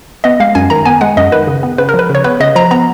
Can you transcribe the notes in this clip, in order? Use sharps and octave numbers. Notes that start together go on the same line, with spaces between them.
B3 D#5
G#3 F5
F#2 G#5
D#3 A#5
B3 G#5
G#3 F#5
F#2 D#5
D#3 B4
C#3
B3
C#3 B4
A#4
F3 B4
C#3 C#5
B3 B4
C#3 D#5
F3 A#5
B3 A#5